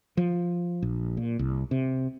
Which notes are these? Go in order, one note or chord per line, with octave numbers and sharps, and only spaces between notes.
F3
A#1
A#2
C2
C3